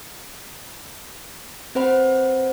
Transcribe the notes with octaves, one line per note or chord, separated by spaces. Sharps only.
C4 B4 C5 F#5 B5